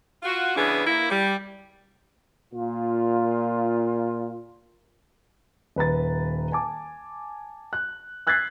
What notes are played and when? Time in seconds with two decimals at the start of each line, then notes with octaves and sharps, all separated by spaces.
0.23 F4 F#4
0.57 C#3 E3 B3 D4 G#4
0.86 A#3 E4
1.10 G3
2.53 A#2 F4
5.76 D#1 B4 A#5 A6
6.52 G#5 A5 D6
7.73 F#6
8.27 E6 F#6 G#6 A6 B6 C7